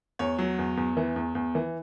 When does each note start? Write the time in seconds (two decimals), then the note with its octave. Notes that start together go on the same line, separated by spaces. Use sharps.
0.19 E2 C#5
0.39 F#3
0.59 E2
0.77 E2
0.97 E3
1.16 E2
1.35 E2
1.55 E3